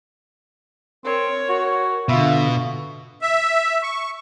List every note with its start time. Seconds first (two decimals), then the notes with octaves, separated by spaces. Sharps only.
1.05 C4 A#4 C#5
1.50 F#4
2.09 B2 D3 F4 E5
3.22 E5
3.83 C#6